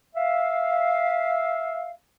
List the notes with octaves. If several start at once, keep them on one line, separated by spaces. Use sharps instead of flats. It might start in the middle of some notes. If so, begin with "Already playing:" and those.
E5 F5